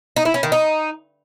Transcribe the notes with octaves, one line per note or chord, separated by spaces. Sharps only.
D#4
E4
C#4
D#3
D#4